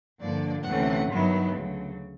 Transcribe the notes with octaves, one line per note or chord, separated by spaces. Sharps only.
G2 D3 F3 A#3 D5
D2 C3 E3 A3 C#4 F#5
G2 D#3 F#3 B3 E4
D2 C#3 F#3